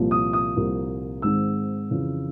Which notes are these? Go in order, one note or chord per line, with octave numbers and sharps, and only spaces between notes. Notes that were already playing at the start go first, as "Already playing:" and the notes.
Already playing: C2 A#2 F3
D#6
D#6
C2 A#2 F3 A#3
G#2 D#3 G#3 C4 E6
F2 C#3 E3